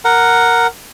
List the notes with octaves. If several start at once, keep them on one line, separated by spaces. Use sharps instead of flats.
A#4 F#5